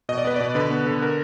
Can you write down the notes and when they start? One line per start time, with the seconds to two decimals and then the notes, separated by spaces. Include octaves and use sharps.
0.09 B2 D#5
0.18 D5
0.25 B3 B4
0.36 B2 D5
0.55 D3 B4
0.71 B3
0.87 D3
1.02 A#4